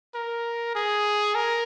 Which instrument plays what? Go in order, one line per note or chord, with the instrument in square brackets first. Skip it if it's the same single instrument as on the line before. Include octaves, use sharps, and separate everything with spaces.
[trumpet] A#4
G#4
A#4